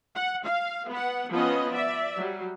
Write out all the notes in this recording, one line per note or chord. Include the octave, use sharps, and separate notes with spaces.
F#5
F5
B3 F#5
F3 B3 C#4 D#5
D5 E5
F#3 G3